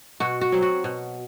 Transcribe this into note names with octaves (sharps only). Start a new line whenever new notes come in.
B2 F#4
F#4
F#3 C4
F#4
B2